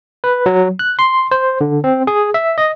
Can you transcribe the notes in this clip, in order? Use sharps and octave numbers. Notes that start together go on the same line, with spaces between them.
B4
F#3
F#6
C6
C5
D3
C4
G#4
E5
D#5